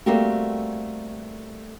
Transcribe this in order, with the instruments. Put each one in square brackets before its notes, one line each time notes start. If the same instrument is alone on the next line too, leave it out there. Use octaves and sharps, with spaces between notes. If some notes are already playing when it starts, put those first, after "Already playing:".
[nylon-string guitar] G3 A3 A#3 C4 F#4 G4